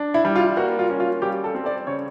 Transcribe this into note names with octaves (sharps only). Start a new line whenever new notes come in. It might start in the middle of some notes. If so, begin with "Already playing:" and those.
Already playing: D4
E4
G3
F4
A#3 F#4
F4
C#4
F4
G3 G4
A4
C4
D5
C#3 C#5